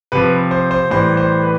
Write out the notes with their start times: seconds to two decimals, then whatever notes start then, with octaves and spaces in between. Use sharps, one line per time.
0.12 C3 F3 B4
0.51 C5
0.71 C5
0.91 A2 E3 G3 C5
1.17 C5
1.43 B4